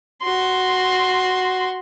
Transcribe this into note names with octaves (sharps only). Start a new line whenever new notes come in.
F#4 C6